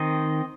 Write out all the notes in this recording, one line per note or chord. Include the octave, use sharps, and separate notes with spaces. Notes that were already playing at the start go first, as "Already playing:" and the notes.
Already playing: D#3 C4 D#5